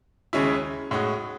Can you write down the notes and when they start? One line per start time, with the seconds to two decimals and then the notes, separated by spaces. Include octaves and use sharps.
0.33 D#2 C#3 G#3 C#4 E4
0.91 A2 G#3 D#4 F#4